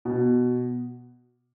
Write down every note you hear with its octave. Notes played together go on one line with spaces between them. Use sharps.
B2